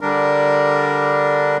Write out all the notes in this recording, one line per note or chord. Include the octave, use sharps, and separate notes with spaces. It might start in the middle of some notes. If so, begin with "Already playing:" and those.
D3 G3 D4 A#4